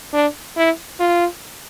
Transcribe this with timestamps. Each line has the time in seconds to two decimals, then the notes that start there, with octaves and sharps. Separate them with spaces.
0.13 D4
0.57 E4
1.00 F4